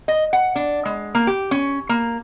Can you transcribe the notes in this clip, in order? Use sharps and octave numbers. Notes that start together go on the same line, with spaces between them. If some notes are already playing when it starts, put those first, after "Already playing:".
D#5
F#5
D4
G#3
A#3
G4
C#4
A#3